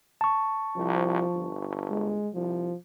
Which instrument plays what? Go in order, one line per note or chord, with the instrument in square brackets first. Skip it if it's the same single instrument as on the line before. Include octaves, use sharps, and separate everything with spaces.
[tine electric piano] A5 C#6
[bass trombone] C2 [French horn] F3
[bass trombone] G1
[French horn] G#3
[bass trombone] C2 [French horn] F3